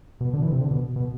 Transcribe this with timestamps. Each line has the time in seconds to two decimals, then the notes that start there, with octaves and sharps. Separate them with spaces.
0.21 B2
0.34 D3
0.42 E3
0.52 C3
0.61 D3
0.71 B2
0.96 B2